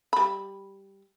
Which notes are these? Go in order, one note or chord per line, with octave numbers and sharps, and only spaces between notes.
G3 B5